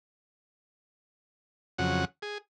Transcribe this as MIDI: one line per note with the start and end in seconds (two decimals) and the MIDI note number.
1.78 2.05 41
1.78 2.05 49
1.78 2.05 54
1.78 2.05 78
2.22 2.38 68